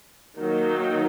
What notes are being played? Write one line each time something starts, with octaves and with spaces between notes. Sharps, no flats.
D#3 F#3 A#3 D#4